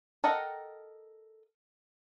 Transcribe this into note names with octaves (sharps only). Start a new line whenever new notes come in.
A4 A#4 D#5 F#5 G5